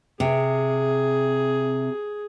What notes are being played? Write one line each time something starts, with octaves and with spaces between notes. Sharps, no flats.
C3 G#4